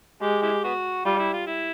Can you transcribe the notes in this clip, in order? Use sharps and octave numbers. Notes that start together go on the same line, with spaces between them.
G#3 G4
E4 G4
B3 F#4
G3 F4
E4
F4
E4